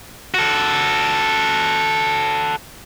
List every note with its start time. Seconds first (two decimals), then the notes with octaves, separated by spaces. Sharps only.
0.34 F#4 A4